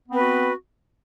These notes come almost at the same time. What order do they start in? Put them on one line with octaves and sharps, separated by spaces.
B3 C4 B4 F#4